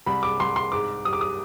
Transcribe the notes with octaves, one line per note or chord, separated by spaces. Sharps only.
C2 B5
D6
C2 C6
C6
G#2 D6
G3 D#6
D6
D#6